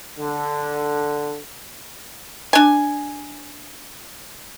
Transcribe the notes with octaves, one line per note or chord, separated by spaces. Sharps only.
D3
D4 G#5